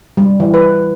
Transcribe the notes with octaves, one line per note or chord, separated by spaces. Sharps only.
G3
E3
B4